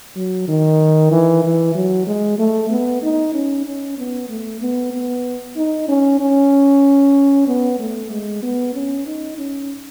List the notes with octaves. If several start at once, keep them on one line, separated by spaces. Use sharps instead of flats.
F#3
D#3
E3
E3
F#3
G#3
A3
B3
D#4
C#4
C#4
B3
A3
B3
B3
D#4
C#4
C#4
B3
A3
G#3
B3
C#4
D#4
C#4